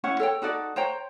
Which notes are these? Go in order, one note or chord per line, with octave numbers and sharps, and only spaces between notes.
C#4 E4 C#5 F#5
A4 C#5 G5
D#4 F#4 A4 D5
C5 C#5 G5 A#5